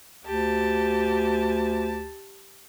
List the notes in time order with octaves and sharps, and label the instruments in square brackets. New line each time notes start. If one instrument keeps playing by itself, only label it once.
[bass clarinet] D2 [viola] G4 A5